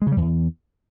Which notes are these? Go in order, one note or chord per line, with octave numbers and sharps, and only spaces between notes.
G#3
C#3
G3
F2
E2